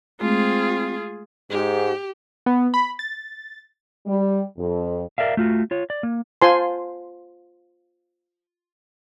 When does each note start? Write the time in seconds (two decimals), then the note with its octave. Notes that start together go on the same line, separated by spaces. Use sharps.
0.21 G#3 A3 C4 F4 G#4
1.50 G#2 G4
2.46 B3
2.74 B5
2.99 A6
4.06 G3
4.57 F2
5.18 A#4 D5 E5 F5
5.37 A3 F4 F#4
5.71 F4 C#5
5.90 D5
6.03 A#3
6.42 F4 C5 G#5 A5 C6